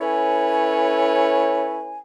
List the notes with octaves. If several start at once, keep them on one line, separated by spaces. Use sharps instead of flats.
C#4 E4 A4 B4 C#5 G#5